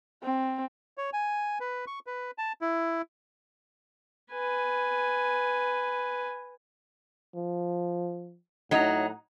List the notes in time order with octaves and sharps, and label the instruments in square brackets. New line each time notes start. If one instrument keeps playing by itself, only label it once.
[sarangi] C4
[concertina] C#5
G#5
B4
C#6
B4
A5
E4
[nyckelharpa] B4 G#5
[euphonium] F3
[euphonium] A2 [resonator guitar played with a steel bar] F#3 D#4